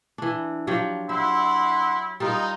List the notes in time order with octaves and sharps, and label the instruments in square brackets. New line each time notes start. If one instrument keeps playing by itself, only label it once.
[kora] E3 D4
F3 F#3 G4
[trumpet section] E4 F#5 C6 [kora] E5
[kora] G3 F4 A#4 [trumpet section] D#4